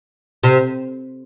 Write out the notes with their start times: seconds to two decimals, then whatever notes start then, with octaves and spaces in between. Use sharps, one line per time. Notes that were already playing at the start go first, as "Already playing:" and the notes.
0.43 C3